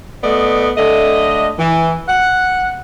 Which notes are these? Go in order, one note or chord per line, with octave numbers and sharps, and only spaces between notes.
A3 B3 D5 D#5
D3 A3 D#5
E3
F#5